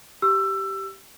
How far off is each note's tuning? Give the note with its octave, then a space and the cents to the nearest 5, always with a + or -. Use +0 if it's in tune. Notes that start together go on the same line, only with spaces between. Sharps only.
G4 -10 E6 +20